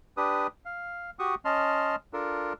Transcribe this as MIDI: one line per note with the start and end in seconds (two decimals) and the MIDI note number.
0.17 0.47 62
0.17 0.47 67
0.17 0.47 71
0.17 0.47 87
0.65 1.10 77
1.19 1.35 66
1.19 1.35 67
1.19 1.35 85
1.19 1.35 87
1.45 1.96 61
1.45 1.96 75
1.45 1.96 81
1.45 1.96 84
1.45 1.96 89
2.13 2.53 62
2.13 2.53 65
2.13 2.53 69
2.13 2.53 70